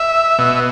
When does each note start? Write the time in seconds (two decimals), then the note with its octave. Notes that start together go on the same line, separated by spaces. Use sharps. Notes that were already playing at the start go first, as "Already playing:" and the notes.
Already playing: E5
0.39 B2